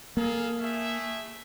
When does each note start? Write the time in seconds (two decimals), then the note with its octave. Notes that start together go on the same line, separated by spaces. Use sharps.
0.17 A#3 G#4 A4 F5
0.60 A3 G#4 E5